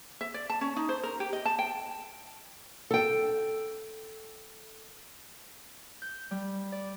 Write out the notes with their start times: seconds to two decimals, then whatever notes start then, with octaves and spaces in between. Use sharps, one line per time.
0.21 E5
0.34 D5
0.50 A5
0.61 C#4
0.76 D#4
0.89 C5
1.03 A#4
1.20 G4
1.33 D#5
1.45 A5
1.59 G5
2.91 A4 G5
6.02 G6
6.31 G3
6.72 D5